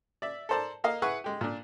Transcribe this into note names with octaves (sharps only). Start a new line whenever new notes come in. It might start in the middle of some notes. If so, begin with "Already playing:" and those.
D5 E5
A4 A#4 C5 D5 A5
A#3 D#5 F5
E4 G#4 B4 F#5 C#6
G#3 G4
A#2 D4